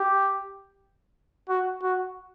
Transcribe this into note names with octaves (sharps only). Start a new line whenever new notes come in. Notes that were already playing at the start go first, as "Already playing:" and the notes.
Already playing: G4
F#4
F#4